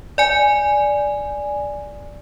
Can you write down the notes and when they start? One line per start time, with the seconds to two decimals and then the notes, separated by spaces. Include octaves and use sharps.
0.18 D5 G#5